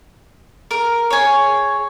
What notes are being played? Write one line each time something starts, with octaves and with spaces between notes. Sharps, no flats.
A#4
G#4 C#5